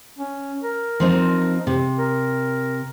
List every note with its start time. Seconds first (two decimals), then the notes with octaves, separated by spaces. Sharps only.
0.18 C#4
0.63 A#4
1.00 F3 C4 D#4
1.67 C3
1.99 A#4